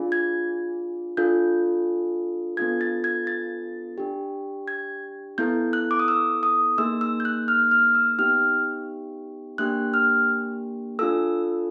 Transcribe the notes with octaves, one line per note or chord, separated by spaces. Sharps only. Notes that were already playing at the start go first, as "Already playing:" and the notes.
Already playing: D4 F4 G#4
G#6
D4 F4 A4 G6
B3 D4 F4 A4 G#6
A6
G#6
A6
D4 G4
G#6
B3 E4 A4 G6
F#6
D6
D#6
E6
D#6
A#3 D#4 G#4 E6
E6
G6
F#6
F6
F6
E6
B3 D#4 G4 F6
A#3 D4 G4 F#6
F6
D4 F4 A4 E6